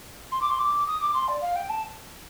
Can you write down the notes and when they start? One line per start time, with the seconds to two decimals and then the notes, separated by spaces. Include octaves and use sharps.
0.32 C6
0.41 D6
0.50 C6
0.59 D6
0.87 D#6
1.01 D6
1.14 C6
1.28 D5
1.41 F5
1.56 G5
1.69 A5